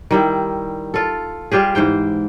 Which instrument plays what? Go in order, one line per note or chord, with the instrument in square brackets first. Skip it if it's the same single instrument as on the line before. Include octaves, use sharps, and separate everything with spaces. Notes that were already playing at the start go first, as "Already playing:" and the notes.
[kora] D#3 G3 E4
F4 A4
G3 F4 G4 G#4
G#2 E3 C5 G5